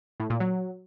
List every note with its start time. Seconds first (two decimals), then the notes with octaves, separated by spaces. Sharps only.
0.20 A2
0.30 A#2
0.40 F#3